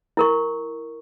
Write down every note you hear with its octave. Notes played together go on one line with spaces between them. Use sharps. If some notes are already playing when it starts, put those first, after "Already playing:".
E4 A#4 C#6